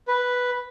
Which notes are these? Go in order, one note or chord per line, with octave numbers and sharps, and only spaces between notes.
B4